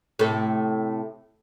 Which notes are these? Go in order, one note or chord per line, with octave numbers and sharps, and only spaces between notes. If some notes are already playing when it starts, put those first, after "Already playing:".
A2 C3 A4